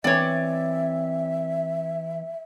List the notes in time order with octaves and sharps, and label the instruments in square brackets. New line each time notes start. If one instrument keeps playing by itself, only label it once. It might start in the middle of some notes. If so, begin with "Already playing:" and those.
[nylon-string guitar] E3 C4 G#5 [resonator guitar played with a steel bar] C#5 D5 [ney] E5